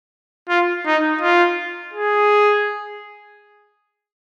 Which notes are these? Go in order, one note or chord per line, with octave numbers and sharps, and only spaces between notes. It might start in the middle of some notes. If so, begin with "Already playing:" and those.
F4
D#4
F4
G#4